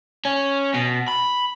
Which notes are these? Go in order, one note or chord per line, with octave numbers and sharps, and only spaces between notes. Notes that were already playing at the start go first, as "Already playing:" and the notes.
C#4
B2
B5